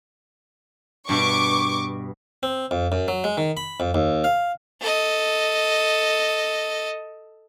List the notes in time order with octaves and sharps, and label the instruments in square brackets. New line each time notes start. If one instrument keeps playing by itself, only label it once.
[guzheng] G2 B2 [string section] C#6 D6
[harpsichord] C4
F2
F#2
F#3
G#3
D#3
B5
F2
D#2
F5
[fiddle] A4 D#5